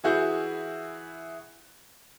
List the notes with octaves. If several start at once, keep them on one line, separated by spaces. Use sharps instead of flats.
E3 E4 F#4 G#4 G6